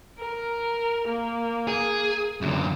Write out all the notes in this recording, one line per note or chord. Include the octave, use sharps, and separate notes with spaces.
A#4
A#3
G#4
F#2 D3